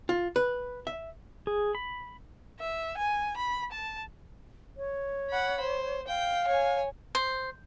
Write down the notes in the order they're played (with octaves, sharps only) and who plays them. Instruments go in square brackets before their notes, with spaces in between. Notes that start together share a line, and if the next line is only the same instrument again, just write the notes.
[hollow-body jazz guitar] F4
B4
E5
[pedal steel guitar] G#4
B5
[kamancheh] E5
G#5
B5
A5
[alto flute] C#5
[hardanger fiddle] F#5 B5
C5
[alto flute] F5 [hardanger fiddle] G5
[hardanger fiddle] C#5 G#5
[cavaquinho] C5